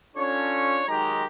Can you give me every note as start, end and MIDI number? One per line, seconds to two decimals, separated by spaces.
0.16 0.84 61
0.16 0.84 62
0.16 0.84 65
0.16 0.84 69
0.16 0.84 73
0.88 1.25 51
0.88 1.25 54
0.88 1.25 56
0.88 1.25 63
0.88 1.25 67
0.88 1.25 82